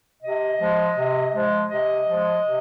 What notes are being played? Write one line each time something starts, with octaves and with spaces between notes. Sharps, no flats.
C3 D#5
F3 G#3
C3
F3 G#3
C3 D#5
F3 G#3
C3